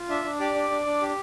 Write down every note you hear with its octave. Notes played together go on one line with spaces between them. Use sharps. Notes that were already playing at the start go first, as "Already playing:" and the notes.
Already playing: F4
D4 E5
D4
G4 D5
D4
D4
D4
G4